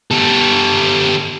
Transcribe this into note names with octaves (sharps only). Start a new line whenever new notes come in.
G3 A4